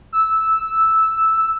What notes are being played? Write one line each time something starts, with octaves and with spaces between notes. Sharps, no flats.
E6